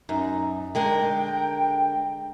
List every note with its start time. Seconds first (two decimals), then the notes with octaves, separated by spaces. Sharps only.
0.09 F#2 D#4
0.75 D3 G#3 A#4 G5